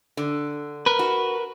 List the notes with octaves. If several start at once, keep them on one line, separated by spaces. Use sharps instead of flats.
D3
A#4 B4
F#4